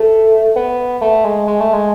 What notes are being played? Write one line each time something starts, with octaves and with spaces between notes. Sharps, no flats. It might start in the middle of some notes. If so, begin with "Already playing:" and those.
Already playing: A3
B3
A3
G#3
G#3
A3
G#3